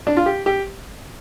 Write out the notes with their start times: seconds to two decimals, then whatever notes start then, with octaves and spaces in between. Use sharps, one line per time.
0.07 D4
0.17 F4
0.26 G4
0.46 G4